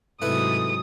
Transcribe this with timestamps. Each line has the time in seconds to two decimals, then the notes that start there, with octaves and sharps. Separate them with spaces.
0.22 G#2 C3 F#3 A3 E4 B4 D#6